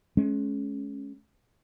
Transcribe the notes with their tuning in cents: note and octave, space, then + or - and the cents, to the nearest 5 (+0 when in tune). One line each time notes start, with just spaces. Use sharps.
G#3 +35 C#4 +0